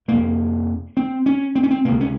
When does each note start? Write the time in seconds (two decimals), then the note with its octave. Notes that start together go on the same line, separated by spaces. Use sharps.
0.08 F2 C3 A#3
0.97 C4
1.26 C#4
1.55 C4
1.63 C#4
1.71 C4
1.85 C#2 C3 A#3
2.00 C#4